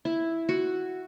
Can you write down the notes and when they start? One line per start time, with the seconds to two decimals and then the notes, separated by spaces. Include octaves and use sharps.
0.05 E4
0.49 F#4